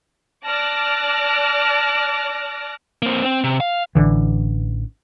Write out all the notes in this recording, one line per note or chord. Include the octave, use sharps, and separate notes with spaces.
D5 A5 D6 F6 F#6 A#6
A#3 C4
C4
C3
F5
A1 D3 E3